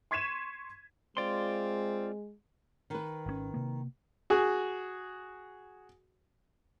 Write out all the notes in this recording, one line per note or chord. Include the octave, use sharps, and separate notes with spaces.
C6 C#6 G#6 B6 D#7 E7
G#3 C4 F4 D5 C6
D#3 B4
G#1 C3 C#4
C3 A#3
F#4 G#4